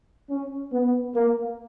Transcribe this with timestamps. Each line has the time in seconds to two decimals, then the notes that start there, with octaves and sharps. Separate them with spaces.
0.30 C#4
0.72 B3
1.15 A#3